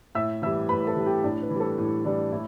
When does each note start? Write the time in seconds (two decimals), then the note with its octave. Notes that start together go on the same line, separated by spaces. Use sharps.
0.15 A2 E5 E6
0.42 E3 G3 E5 E6
0.69 A2 B4 B5
0.87 A4 A5
0.96 E3 G3
1.06 G4 G5
1.24 A2 D4 D5
1.42 B4
1.50 E3 G3
1.60 A4
1.78 A2
2.05 E3 G3 D4 D5
2.32 A2 E4